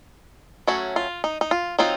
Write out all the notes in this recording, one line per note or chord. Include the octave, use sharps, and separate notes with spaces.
F#3 A3 C#4 F#4
F4
D#4
D#4
F4
F#3 C4 D#4 F4